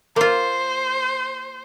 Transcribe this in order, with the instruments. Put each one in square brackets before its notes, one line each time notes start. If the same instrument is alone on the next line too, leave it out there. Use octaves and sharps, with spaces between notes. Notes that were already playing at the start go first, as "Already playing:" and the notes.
[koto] A#3 F4 [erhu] C5